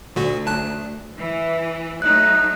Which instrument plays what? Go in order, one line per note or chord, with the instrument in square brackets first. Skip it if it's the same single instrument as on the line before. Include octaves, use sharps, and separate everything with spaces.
[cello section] D2 [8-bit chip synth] A#2 D3 F#4
[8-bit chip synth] B1 A5 F#6
[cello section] E3
[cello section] F#3 A3 D#4 [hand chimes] F#6